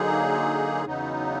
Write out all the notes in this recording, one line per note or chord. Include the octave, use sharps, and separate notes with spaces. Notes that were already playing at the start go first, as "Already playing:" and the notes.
Already playing: D3 F#3 A#3 D#4 G#4
E2 C#3 F#3 B3 D#4